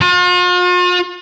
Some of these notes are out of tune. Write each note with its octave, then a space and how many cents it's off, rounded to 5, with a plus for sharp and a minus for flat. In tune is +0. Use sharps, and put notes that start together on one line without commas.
F4 +45